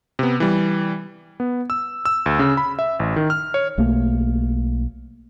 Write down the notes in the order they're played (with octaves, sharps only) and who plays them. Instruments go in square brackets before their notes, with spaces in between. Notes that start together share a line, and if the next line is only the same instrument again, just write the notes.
[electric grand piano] C3 B3
E3 G3
B3
E6
E6
D2
C#3
B5
E5
A1
D#3
F6
C#5
[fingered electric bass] B1 A3 A#3